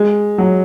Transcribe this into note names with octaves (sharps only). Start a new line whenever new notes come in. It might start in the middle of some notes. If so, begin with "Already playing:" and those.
Already playing: G#3
F#3